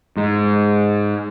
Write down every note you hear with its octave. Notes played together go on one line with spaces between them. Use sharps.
G#2